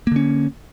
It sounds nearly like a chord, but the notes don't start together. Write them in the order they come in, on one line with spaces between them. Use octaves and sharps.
A#3 D3 C#4